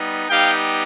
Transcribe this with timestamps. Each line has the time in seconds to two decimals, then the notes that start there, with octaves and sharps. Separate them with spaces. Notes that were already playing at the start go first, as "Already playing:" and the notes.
Already playing: G3 B3 D#4
0.30 G3 B3 D#4 G4 F5 G5